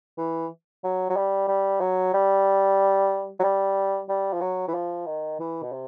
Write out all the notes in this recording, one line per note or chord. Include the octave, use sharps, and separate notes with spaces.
E3
F#3
F#3
G3
G3
F#3
G3
F#3
G3
G3
F3
F#3
E3
F3
D#3
E3
B2
C3